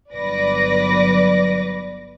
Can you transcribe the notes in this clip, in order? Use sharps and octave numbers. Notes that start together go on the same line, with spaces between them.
G1 F#3 B4 D5 D6 A#6